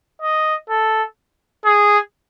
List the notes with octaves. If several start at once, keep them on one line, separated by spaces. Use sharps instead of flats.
D#5
A4
G#4